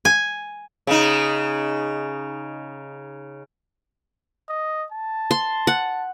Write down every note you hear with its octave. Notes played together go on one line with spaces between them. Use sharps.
G#5
C#3 D#4
D#5
A5
C6
F#5